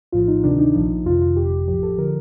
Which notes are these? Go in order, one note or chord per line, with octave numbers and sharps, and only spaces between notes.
A#1 A2 F3 F4
D#4
D2 C3 D#3 D4
D#4
A#1 A#2 F3
F2 C3 D#3 F4
F4
G1 F2 C3 G4
A1 A2 F3 G4
A4
D3 F3 A#4